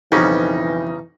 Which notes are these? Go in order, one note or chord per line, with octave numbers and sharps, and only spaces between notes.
B1 F2 C#3 E3 G3 C#4 D#4